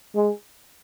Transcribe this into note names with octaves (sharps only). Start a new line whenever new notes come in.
G#3